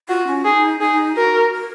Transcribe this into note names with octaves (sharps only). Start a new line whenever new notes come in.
F4 F#4
C#4
D#4 G#4
D#4 G#4
F#4 A#4
A#4